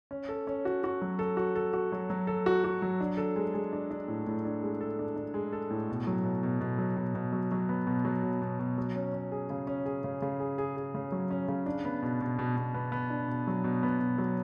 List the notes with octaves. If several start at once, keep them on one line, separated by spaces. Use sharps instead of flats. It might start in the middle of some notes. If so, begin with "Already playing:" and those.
C#4
A4
C#4
F#4
F#4
F#3
A4
F#4
A4
F#4
F#3
F#3
A4
F#4
F#4
F#3
D4
A4
G#3
G#3
D4
D4
A2
A2
D4
G#3
A4
D4
D4
G#3
A4
A2
B2
F#3
B2
B2
B2
F#3
B2
B2
F#3
F#3
B3
B2
F#3
B2
B2
B2
F#3
C#4
C#4
G#4
C#3
C#4
G#4
C#3
C#3
G#4
G#4
G#4
C#3
F#3
C#4
C#3
D4
B3
B2
B2
B2
B2
B3
B3
D4
B2
F#3
B2
B3
B2
F#3